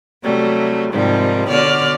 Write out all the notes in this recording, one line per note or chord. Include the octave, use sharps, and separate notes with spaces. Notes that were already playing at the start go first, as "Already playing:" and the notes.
C3 F#3 G3 A3
G#2 C3 D#3 F3 G3
B2 D3 C#5 D5 F6